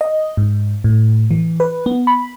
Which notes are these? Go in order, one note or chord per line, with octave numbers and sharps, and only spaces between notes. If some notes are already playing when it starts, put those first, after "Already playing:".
D#5
G#2
A2
E3
B4
B3
B5